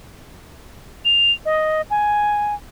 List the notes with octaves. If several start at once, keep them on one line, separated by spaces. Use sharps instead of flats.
F7
D#5
G#5